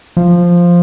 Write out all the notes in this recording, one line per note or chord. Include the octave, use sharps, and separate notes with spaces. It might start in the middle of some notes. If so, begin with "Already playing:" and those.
F3